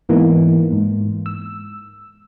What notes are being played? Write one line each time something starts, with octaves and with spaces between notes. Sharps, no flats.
G#2 E3 A#3 B3 D#4
G#2
E6